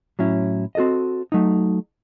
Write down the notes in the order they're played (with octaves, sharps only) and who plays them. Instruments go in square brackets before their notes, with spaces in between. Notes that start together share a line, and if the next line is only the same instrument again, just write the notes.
[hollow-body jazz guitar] A2 F#3 C#4 E4
C4 F#4 A4 D#5
F#3 A3 D#4